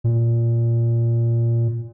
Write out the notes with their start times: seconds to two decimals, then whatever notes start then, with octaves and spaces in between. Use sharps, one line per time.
0.04 A#2